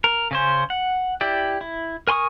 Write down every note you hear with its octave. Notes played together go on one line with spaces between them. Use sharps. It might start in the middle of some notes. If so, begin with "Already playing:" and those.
A#4
C#3 C#4 C5
F#5
E4 G4 D5
E4
A#4 G#5 C6 C#6 D#6